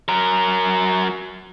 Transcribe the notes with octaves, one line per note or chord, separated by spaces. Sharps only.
F#3 A#4